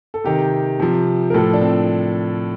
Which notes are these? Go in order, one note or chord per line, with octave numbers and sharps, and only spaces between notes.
A4
C3 D#3 G4
C3 F3
A#4
A2 F3 A4
D4
C4